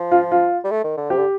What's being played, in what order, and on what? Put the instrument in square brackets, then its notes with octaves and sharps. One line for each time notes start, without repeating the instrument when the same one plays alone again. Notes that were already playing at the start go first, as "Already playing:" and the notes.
Already playing: [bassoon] F3
[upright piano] F4
F4
[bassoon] G3
A3
D#3
D3
[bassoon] C3 [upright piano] G4
[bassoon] D3